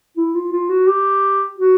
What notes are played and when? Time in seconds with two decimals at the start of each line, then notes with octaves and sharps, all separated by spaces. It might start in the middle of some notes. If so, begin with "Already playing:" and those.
0.17 E4
0.34 F4
0.52 F4
0.69 F#4
0.87 G4
1.58 F#4